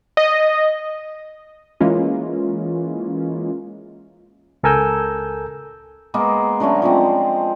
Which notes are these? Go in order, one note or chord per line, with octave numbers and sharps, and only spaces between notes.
D#5
E3 G#3 A#3 C#4 F4
C#2 A4 A#4 G#5 E6 G6
G#3 A#3 B3
D3 F#3 A3 C#4
F3 G#3 C4